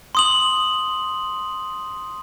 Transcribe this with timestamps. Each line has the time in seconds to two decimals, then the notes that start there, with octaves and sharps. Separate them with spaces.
0.15 C6 D#6 F#7